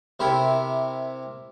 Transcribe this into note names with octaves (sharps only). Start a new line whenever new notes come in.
C3 E4 A#4 G5